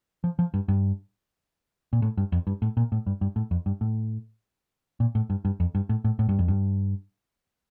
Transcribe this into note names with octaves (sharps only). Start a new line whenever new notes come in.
F3
F3
G2
G2
A#2
A2
G2
F2
G2
A2
A#2
A2
G2
G2
A2
F2
G2
A2
A#2
A2
G2
G2
F2
G2
A2
A2
A2
G2
F2
G2